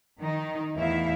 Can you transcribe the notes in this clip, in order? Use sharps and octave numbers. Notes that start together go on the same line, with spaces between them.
D#3 D#4
E2 A2 E4 E5 F5